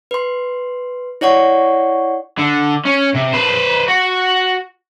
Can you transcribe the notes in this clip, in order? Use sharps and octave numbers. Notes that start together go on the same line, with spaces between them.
B4 C6
E4 C#5 D5 F#5 C#6
D3
C#4
C3
B4 C5
F#4